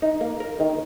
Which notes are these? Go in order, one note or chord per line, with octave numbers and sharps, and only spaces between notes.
D#4
A#3
A#4
D#3